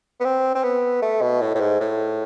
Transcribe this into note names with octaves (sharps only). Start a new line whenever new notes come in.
B3
C4
C4
B3
A3
B2
A2
A2
G#2
A2